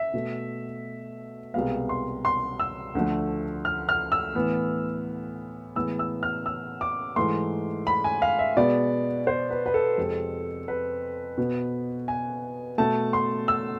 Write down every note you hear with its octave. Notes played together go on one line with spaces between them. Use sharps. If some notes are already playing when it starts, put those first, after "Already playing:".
Already playing: E5
B2 A3
C2 B2 G#3 B3 F5
C6
C6
E6
D2 D3 F3 A3
F6
F6
E6
A2 E3 B3
A2 E3 G#3 B3 E6
E6
F6
E6
D6
G#2 E3 A3 C6
B5
G#5
F5
E5
B2 G#3 B3 D5
C5
B4
B4
A4
F2 C3 G#3
B4
B2 B3
G#5
B2 A3 A5
C6
E6